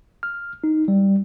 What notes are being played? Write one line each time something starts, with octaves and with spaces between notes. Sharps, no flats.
F6
D#4
G3